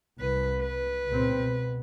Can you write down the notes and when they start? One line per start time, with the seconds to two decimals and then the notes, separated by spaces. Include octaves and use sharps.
0.20 C2 B4
0.61 B4
1.08 C#2 A#2 C4
1.38 B2